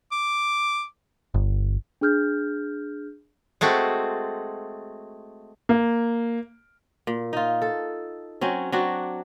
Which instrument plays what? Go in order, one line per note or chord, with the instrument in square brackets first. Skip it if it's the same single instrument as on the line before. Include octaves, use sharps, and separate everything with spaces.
[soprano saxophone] D6
[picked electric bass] G1
[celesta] D4 G#4 F6 G6
[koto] G#3 A3 C4 F#4
[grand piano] A#3
[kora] A#2
D#4 F4
A4
F#3 C4 C#4
F#3 C4 D4 F#4